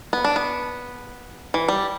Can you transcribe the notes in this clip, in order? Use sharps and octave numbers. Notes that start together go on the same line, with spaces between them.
B3
D4
B3
E3
G3